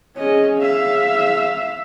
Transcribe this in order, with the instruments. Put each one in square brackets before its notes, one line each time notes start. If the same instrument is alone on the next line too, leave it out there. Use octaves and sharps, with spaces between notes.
[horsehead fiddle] C#4 D#5 [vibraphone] G#4 C#5
[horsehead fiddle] E5 F5